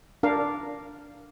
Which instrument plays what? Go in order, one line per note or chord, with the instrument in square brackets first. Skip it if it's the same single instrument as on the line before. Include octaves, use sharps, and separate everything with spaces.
[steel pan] D4 A#4 F5